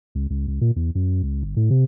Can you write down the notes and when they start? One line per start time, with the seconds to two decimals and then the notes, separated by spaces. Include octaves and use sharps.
0.15 C#2
0.30 C#2
0.48 C#2
0.61 A#2
0.76 E2
0.95 F#2
1.23 C#2
1.43 G1
1.56 A2
1.70 C3